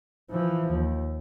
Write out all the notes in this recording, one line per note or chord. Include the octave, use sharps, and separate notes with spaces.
E3 F3
D#2